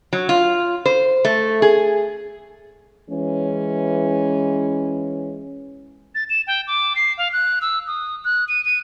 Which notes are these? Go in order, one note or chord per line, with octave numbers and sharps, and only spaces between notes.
F#3
F4
C5
A3
G#4
E3 G#3 C#4
A6
E7
G5
D6
C7
F5
F#6
E6
D#6
F#6
D#7
D#7